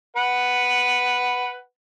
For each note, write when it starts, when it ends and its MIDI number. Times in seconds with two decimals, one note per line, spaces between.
0.16 1.59 71
0.16 1.59 78